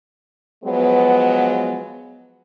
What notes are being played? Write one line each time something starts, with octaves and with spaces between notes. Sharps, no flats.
F3 F#3 G#3 B3